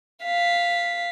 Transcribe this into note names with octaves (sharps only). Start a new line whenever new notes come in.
F5 B6